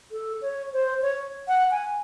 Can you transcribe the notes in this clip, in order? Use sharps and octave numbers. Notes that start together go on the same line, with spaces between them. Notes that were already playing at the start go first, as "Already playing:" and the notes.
A4
C#5
C5
C#5
F#5
G#5